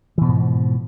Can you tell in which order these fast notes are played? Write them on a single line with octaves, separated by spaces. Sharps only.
E3 B2 F3 G#2